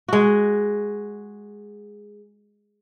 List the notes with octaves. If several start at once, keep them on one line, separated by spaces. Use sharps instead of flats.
G#3 F#4